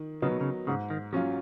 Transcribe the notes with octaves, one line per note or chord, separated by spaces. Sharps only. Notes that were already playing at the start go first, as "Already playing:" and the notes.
Already playing: D#3
C#3 F#3 B3 D#4
B2
C#3
G#2 C#3
D#3
F3 F#3 C#4 F4